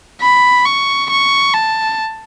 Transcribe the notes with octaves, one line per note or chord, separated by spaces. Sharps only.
B5
C#6
C#6
A5